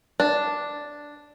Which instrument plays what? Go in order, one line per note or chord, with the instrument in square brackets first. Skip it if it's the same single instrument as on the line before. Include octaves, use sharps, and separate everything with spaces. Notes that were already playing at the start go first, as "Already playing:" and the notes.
[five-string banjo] D4